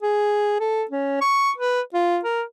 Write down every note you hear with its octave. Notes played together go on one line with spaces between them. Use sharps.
G#4
A4
C#4
C#6
B4
F4
A#4